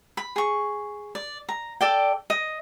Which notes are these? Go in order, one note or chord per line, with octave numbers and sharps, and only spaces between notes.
B5
G#4 C#6
D5
A#5
A4 D5 G5
D#5